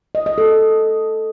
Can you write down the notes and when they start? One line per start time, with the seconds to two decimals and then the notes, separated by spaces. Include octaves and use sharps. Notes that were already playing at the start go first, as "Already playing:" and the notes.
0.15 D#5
0.26 D#5
0.38 A4